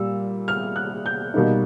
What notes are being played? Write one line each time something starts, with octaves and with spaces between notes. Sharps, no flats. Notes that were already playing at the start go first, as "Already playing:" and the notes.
Already playing: A#2 G3 E6
F6
F#6
G6
B2 G3 A#3 D#4